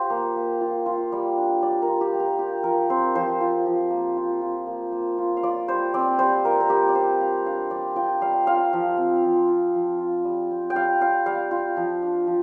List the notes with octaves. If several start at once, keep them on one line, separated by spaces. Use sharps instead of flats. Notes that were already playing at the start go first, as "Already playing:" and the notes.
Already playing: F4 G4 C5
A#3
A#3
F4
F4
G3
D4
G3 D5
A#4
F4
G4
G3
A#4
F4 G4
F3 A#4
C4 C5
F3 C5
F4
F3
A#3
F4
F4
A#3
A#3
F4
F5
F4 D5
G3 C5
C4 D5
G3 C5
F4 A#4
A#4
G3 G4
D5
F4 C5
G3 F5
D4 F5
G3 D5
F4 G5
G3 F5
F4 F5
F3
C4
F3
F4
F3
F4
G3
C4
G5
G3 F5
F4 F5
G3 F5
F4
F3
D4
F3